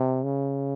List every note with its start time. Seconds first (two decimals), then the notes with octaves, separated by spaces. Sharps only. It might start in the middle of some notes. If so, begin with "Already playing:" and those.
Already playing: C3
0.24 C#3